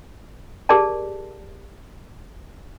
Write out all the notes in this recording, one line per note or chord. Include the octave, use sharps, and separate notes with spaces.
G4 G#4 A#4 D5 A5